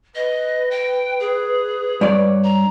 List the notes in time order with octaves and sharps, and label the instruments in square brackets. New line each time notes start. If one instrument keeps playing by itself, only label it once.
[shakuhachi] B4 [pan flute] D#5
[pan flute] G5
G#4
[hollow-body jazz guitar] G2 C#5 D5
[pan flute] A#5